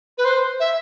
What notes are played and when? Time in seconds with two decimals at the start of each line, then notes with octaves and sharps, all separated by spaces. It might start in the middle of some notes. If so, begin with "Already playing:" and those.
0.18 B4
0.25 C5
0.60 E5